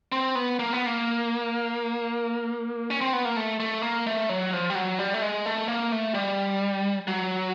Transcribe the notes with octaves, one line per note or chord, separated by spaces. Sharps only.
C4
B3
A#3
B3
A#3
C#4
C4
B3
A#3
A3
A3
A#3
A3
F#3
F3
G3
F#3
G3
A3
G#3
A3
A#3
A3
G3
F#3